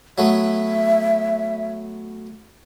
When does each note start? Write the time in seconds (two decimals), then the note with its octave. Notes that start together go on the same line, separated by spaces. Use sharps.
0.18 F#3 A3 B3 E5